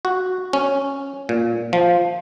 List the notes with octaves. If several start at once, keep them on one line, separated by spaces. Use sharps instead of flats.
F#4
C#4
A#2
F3